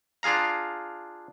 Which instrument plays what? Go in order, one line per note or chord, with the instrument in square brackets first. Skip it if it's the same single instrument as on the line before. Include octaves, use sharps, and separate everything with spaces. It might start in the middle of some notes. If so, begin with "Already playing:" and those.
[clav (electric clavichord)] D4 F4 G#4 F5 A#5